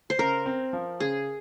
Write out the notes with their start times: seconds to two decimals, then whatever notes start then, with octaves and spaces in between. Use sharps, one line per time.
0.10 C5
0.18 C#3 A#4
0.46 C4
0.73 F3
1.00 C#3 G#4